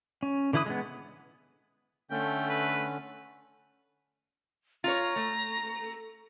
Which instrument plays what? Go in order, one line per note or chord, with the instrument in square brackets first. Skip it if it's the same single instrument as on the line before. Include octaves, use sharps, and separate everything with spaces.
[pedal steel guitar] C#4
D3 E3 E4 B4 D#6
G#3 B3
[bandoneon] D3 C#4 [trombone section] A3 [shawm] G5
[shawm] B4
[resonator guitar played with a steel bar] F4 C#5 [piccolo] A#5
[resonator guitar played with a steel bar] A3